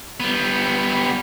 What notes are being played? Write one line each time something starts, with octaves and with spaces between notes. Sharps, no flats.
G3 B3